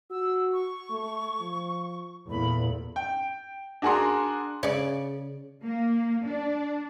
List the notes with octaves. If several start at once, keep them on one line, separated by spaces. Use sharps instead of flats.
F#4 E6
C#6
A3
F3
E2 A#2 A3 B5
G5
D4 F#4 G#4 A#4 F#5 C6
C#3 C#5 D5
A#3
D4